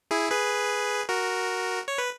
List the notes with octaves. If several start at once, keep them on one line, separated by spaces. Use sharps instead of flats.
E4 G#4
G#4 B4
F#4 A#4
C#5
B4